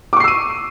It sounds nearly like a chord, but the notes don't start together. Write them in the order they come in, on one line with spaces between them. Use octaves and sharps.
D6 C#6 C7 E6 D#7